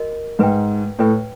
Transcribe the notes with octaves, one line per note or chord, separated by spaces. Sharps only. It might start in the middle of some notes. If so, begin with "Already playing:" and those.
Already playing: F#4 A#4 D#5
G#2 B4 E5 G5
A2 B4 E5 G5